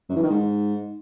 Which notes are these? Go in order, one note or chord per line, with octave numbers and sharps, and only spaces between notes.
F#2
E3
D#3
G#2